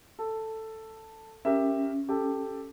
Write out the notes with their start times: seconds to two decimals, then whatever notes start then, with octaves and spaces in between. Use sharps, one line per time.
0.19 A4
1.45 C#4 G4 A#4 E5
2.09 G4 A4